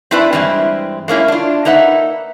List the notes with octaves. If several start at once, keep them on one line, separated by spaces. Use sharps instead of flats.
C4 D4 E4 B4 D5
G2 E3 G#3 C4 E4
G#3 A#3 C#4 E4
D4 F4
A#3 D#4 B4 E5 F#5